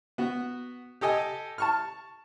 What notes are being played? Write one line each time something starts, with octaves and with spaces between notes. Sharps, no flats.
B3 F#4
G4 A4 D#5 G#5
A5 C#6 F6